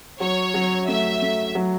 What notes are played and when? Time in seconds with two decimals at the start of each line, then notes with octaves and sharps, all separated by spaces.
0.20 F#3 C#5
0.54 F#3
0.88 A3 E5
1.22 A3
1.55 F#3